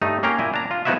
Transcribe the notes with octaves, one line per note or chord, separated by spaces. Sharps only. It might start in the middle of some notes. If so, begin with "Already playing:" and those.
G2 A3 D#4
A#3 C#4 F5 G5 A#5
A#2 E4 G#5
D4 A#5
F4
F3 B3 D#4 E4 F#4 E5